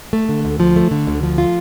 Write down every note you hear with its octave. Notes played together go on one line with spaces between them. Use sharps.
A3
D3
D2
F3
A3
D3
D2
F3
F4